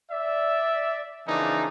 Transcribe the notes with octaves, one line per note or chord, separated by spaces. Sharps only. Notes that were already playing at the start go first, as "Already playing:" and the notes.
D5 E5
C#3 E3 F3 A#3 D4 D#4